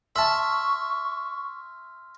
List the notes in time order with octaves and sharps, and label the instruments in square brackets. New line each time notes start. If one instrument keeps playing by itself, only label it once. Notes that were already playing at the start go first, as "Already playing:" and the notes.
[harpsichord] E5 A5 [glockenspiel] C6 F6 [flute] C#6